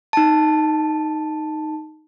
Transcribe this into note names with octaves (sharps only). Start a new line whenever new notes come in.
D#4 A5